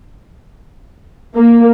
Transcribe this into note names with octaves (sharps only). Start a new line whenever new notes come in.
A#3